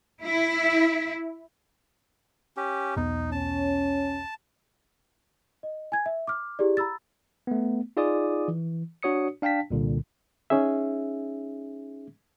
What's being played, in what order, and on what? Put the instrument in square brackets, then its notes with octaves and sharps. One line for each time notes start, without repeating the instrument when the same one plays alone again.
[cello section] E4
[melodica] C#4 G4
[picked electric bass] B1 E2 B3 [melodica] D#4
[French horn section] C#4 [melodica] A5
[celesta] D#5
G#5 G#6
E5
D6 F6
E4 G4 G#4 D5
A#5 B5 E6 A6
[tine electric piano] A3 B3
D#4 F4 G#4 D5 D6 D#6
E3
D4 F#4 C#5 D#6 C#7
D4 F5 G5 A5 B6
C2 A#2 D3
[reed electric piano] C#4 D#4 G#4 E5